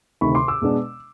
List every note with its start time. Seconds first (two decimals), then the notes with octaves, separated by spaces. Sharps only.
0.21 D2 C3 D#3 B5 C#6
0.35 C6 D6
0.48 D6 E6
0.62 B2 G#3 B3 D4